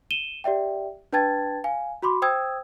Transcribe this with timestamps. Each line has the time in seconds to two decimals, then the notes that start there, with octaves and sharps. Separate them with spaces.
0.11 D#7 E7 G7
0.44 G4 D5 E5 G5
1.13 D4 B4 G5 A5 G#6 A6
1.64 F5 G#5
2.03 F#4 B5 C6 D6
2.22 C5 G5 D#6 E6 G#6